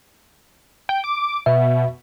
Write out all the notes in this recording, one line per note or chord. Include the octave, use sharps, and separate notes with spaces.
G5
D6
B2 E5